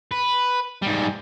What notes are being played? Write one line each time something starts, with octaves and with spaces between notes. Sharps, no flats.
B4
G#2 G3